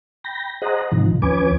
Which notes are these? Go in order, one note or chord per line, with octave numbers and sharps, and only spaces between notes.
G5 B5 A#6
G#4 C5 D#5 F#5 A#5
G#2 C3 D#3 F3
D#2 F3 C#4 B4 G#5 D6